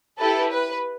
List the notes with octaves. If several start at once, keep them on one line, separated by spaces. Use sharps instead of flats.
E4 G4 A4 B4
B4